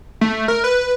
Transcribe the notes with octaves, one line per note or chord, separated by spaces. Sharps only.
A3
A#4
B4